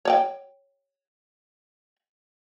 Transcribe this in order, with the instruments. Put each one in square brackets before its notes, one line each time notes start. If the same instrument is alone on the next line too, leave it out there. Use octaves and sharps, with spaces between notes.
[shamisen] C#5 D5 G5